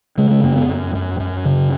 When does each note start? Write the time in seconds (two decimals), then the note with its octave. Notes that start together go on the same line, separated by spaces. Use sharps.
0.18 C#3 G#3
0.31 G#3
0.43 F#2 A#3
0.56 B3
0.69 F#2
0.95 F#2
1.20 F#2
1.45 C#3